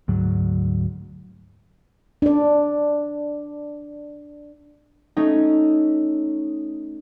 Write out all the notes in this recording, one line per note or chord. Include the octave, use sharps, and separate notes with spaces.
D2 G#2 F#3
D4 D5
A3 C#4 D#4